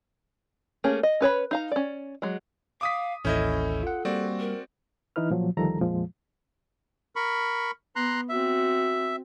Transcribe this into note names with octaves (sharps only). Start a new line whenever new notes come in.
A3 A#3 C#4 G#4
D#5
C#4 B4 C#5 B5
D#4 F5 A#5
C#4 D5
F#3 G#3
F5 D6 D#6 B6
A1 D#2 C#4 E4 A4 D#5 G6
F4 F#5
G3 A#3 C4 F#4 D5
A#4
E3 D#4 E4 B4 F6
A#2 F3 F#3
D2 D#3 F3 G3 A4 A#5
F2 A#2 F3 G#3
A#4 B5 C#6
B3 A#5 C6 F#6
C4 F#4 E5